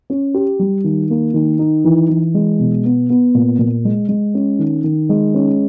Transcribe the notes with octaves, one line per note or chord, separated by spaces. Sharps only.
C#4
G4
G3
D#3
A#3
D#3
D#4
E3
E3
G#3
B2
B3
B3
A#2
A#2
G#3
G#3
C#4
D#3
D#3
G#3
C#4